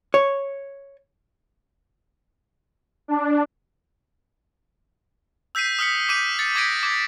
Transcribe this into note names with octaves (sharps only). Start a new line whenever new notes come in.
C#5
D4
E6 G6 B6 C7 D#7
D#6 F6 B6 C#7
D6 G6 D#7
A6 C#7
D6 G#6 A#6 B6 D7 D#7
D6 G#6